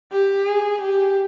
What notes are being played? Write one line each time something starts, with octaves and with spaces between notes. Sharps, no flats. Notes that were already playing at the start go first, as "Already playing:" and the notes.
G4
G#4
G4